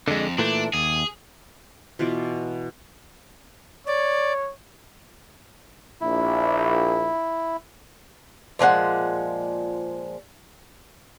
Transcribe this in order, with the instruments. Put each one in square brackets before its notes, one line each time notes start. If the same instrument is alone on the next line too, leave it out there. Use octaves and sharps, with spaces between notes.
[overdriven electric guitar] F2 [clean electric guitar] D3 G#3
[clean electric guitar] A#2 E3 A3 [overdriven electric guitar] D4
[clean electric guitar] D#2 [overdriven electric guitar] G#4
[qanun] B2 E3 F4 D5
[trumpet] C#5 [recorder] D5
[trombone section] A#1 [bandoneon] E4
[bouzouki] A#2 F3 G#3 F#5